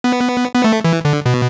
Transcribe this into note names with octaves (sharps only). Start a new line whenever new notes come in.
B3
B3
A3
E3
D3
B2